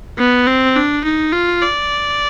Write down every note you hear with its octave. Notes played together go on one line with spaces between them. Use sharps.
B3
C4
D4
D#4
F4
D5